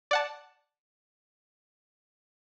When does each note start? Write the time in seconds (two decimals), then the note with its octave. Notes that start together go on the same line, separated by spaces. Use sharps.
0.11 D5 F#5 A5